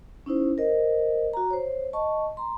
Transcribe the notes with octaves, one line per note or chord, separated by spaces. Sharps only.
C#4 D#4 E4 C5
A#4 C5 D#5
F#4 A#5
C5 C#5
D#5 A5 C#6
A#5 C6